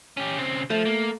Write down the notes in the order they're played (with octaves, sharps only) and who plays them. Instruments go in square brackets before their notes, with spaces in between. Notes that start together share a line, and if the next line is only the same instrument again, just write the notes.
[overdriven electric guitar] C#4 G4
C#3 C4
[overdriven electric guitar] F3 [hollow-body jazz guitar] A3
[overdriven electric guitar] A#3